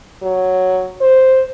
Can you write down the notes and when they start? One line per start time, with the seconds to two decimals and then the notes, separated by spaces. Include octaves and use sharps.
0.23 F#3
1.01 C5